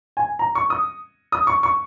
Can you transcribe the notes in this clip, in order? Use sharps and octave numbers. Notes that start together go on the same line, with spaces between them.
G#5
A#5
C#6
D#6
D#6
C#6
C#6